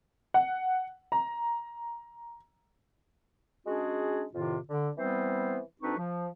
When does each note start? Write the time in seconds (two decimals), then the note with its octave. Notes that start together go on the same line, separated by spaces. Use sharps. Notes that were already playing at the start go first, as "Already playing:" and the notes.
0.34 F#5
1.12 A#5
3.67 G#3 C#4 D4 F#4 G#4
4.34 F2 A2 C3 D#3 F4
4.68 D3
4.97 E3 G3 B3 C4 C5
5.82 D2 C4 D4 D#4 B4 C#6
5.97 F3